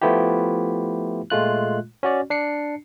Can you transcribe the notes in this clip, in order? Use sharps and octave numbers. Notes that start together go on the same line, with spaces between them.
F3 A3 B3 E4 F4 G4
A#2 G#3 A3 F4 F#6
C#4 F#4 D5
D4 C7 C#7